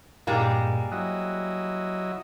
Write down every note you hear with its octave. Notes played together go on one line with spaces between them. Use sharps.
G2 A#2 G3 G#3 A#3 A#5
F#3 E4 D#5 F#6